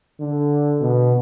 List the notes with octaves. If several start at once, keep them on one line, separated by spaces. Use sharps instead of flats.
D3
B2